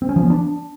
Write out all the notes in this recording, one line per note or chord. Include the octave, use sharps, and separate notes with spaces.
C4
C#4
F3
B3
D4